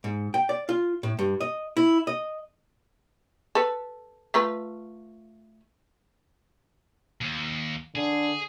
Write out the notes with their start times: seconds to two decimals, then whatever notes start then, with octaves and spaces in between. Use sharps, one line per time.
0.04 G#2
0.34 G5
0.49 D5
0.69 F4
1.03 A2
1.19 G2
1.41 D#5
1.77 E4
2.07 D#5
3.55 A4 B4
4.34 A3 F4 B4
7.21 D#2
7.95 D3 G#4